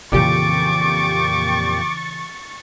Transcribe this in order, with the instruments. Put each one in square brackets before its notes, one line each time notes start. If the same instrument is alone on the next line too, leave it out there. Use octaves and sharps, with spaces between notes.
[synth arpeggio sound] F2 A#2 G4 [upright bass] C#3 E3 [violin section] C#6 A6 [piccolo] D6